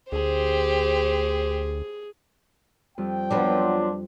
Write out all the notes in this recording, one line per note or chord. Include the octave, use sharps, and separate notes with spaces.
D2 G4 G#4 C5
F2 G3 G5
F3 F#3 B3 D4